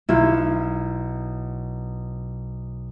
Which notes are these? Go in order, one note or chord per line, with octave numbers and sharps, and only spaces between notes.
B1 E4 F4